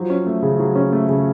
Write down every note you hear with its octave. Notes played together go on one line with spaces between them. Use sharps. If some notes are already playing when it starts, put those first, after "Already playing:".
Already playing: F3 F#3
C#4
A3
C#3
F#3
C#4
A3
C#3